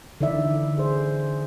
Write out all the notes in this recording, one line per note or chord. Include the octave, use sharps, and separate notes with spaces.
D3 E3 D#4 D5 E5
G#4 C5